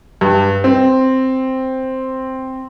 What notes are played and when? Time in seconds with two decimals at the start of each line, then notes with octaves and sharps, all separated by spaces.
0.21 G2
0.64 C4